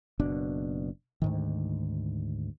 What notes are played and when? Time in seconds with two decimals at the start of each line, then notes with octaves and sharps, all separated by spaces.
0.19 F#1 B2 D4
1.22 D2 G#2 D#3